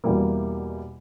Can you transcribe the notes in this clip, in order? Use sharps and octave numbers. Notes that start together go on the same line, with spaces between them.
E2 B2 G3 A#3 E4